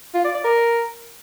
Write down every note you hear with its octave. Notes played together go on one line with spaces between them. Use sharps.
F4
D5
D5
A#4